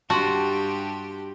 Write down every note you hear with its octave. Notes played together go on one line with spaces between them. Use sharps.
G2 F#4 G4 A5 C6